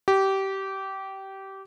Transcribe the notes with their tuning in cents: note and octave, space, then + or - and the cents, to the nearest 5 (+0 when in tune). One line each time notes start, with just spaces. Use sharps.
G4 -20